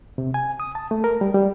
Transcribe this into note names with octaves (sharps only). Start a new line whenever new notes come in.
C3
G#5
D#6
A5
A3
A#4
G3
G3